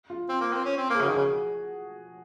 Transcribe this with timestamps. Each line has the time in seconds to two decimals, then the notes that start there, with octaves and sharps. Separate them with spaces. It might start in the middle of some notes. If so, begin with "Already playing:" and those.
0.10 F4
0.29 C4
0.41 A#3
0.53 C4
0.65 C#4
0.77 C4
0.90 A#3
0.94 G#4
1.01 C#3 F#4
1.09 D#3
1.14 G#4
1.16 C#3